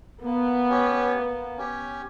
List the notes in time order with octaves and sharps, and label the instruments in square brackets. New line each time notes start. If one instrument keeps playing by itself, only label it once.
[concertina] A#3 [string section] B3
[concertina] C#4 G4 C#5
A#3
C#4 G4 C#5